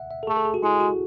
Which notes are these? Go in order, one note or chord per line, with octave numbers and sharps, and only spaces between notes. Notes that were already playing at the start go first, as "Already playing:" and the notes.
Already playing: E5 F#5
E5
A4
A3 G#4
A4
G#4
F#4
G#3 E4
F#4